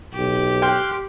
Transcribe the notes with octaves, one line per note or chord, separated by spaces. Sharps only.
B1 G4
G5 C6 F6 F#6